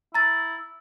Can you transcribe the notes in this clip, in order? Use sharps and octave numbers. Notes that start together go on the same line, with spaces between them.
E4 A#5 A6